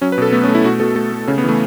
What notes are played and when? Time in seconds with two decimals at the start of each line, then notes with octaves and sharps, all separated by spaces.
0.01 F#3 C#4
0.12 B4
0.18 B2 A4
0.32 A3 B3
0.44 C#4
0.48 A3
0.55 E4
0.64 B2 F#4
0.80 B2 A4
0.96 A3 A4
1.12 A3
1.28 C#3 C#4
1.38 B3
1.44 E3 A3